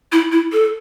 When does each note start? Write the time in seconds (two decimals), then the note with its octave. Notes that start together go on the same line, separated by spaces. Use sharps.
0.12 E4
0.32 E4
0.53 A4